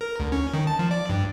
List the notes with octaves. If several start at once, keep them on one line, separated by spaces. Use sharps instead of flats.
A#4
D2
C#4
D#3
A5
F3
D5
G2